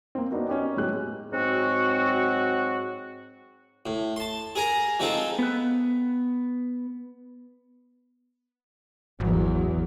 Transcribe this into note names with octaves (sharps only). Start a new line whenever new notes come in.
A#3 C4
B3 D4 D#4 F#4 A#4
C#4 D#4 G4
A2 F#3 G#3 B3 G4 F#6
G#2 F#3 C4 F#4
A2
A5 C6
G#4 A#4 G#5 A#5
F3 G#3 C4 D#4 F4 A4
B3 F#6
G#1 E2 F#3